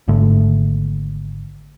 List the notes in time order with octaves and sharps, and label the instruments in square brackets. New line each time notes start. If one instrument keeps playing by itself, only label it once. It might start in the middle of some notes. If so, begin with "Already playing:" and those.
[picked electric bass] G#1 G#2 D3 A3